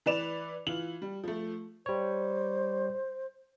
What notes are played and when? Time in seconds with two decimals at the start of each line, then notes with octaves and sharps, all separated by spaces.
0.06 E3 B4 D5 E7 F7
0.67 E3 F4 F#7
1.02 G3
1.24 F3 A3
1.86 G3 C5 C#5